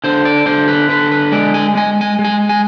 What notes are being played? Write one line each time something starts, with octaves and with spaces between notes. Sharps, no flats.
D3 C5
D5
D3 C5
B4
D3 B4
B4
G#3 D5
G#5
G#3 G#5
G#5
G#3
G#5
G#5